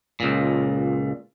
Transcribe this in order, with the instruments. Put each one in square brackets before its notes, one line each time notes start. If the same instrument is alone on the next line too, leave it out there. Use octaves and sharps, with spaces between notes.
[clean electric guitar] C#2 A#2